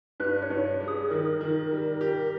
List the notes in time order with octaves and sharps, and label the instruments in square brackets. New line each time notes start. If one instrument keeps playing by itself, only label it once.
[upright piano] G2 [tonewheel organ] B4
[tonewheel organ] C#5
[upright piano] G2
G3
[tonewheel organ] G#4
[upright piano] D#3 [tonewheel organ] A#4
[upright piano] D#3
G3
G4